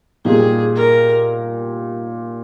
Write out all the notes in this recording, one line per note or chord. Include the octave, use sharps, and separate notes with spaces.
A#2 G3 A#3 D#4 G4 G#4
A#4